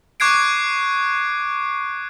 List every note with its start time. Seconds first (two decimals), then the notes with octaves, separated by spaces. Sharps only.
0.20 C#6 D6 F#6 G#6 C7 D7